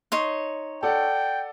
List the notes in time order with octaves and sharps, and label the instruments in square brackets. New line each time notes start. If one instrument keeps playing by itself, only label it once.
[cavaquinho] D#4 C#5 C6
[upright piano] A4 D5 F#5 [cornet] G5